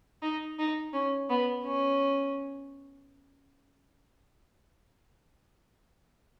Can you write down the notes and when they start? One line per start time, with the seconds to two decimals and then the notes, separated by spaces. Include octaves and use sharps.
0.22 D#4
0.59 D#4
0.93 C#4
1.29 B3
1.65 C#4